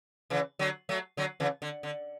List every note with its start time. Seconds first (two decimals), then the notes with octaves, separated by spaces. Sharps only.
0.30 C#3 E3
0.59 D3 F#3
0.89 F#3 A3
1.17 D3 F#3
1.40 C#3 E3
1.62 D3
1.83 D3